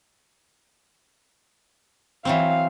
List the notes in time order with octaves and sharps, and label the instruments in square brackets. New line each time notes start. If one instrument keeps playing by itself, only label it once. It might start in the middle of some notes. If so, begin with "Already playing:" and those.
[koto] E3 F#3 C4 [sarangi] F5